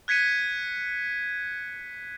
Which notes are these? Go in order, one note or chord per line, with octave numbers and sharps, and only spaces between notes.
F#6 G#6 B6 C#7 D#7